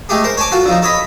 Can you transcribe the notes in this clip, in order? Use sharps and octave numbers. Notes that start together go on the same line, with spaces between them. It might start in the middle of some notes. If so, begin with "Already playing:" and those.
G#3 A3 G4 G#4
A#4 C5
C#5 G#5 A5 D6
F4 F#4 A4
D3 F3 D#4
A4 C#5 D#5 B5